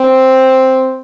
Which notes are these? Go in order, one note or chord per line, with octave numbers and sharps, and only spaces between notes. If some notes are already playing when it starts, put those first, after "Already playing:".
Already playing: C4